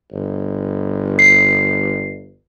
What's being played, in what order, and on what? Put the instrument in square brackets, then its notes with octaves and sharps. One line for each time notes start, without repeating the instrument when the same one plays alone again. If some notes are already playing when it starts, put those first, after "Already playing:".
[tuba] G1
[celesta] C7